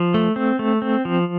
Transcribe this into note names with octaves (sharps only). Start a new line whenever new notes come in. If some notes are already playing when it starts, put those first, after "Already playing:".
Already playing: F3
A3
C4
A3
C4
F3